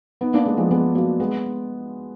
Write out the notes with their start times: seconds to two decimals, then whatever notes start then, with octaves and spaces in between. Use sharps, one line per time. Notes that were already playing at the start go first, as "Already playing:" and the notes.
0.21 B3 D#4
0.34 A#3 D4
0.45 G#3 B3
0.58 F3 G#3
0.71 G#3 B3
0.95 F#3 A#3
1.20 G#3 B3